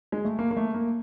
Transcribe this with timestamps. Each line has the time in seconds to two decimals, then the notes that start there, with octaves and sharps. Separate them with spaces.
0.12 G#3
0.25 A3
0.39 A#3
0.51 A#3
0.57 A3
0.75 A#3